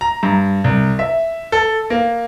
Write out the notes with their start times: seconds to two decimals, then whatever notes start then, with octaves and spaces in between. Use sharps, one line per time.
0.01 A#5
0.23 G2
0.64 C2
0.99 E5
1.52 A4
1.90 A#3